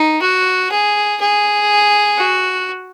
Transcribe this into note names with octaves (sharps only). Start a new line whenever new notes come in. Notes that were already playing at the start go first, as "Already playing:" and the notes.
Already playing: D#4
F#4
G#4
G#4
F#4